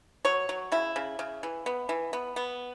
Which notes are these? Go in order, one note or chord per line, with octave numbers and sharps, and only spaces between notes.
F#3 C#5
F#3
C#3 E4
C#3
C#3
E3
B3
E3
B3
B3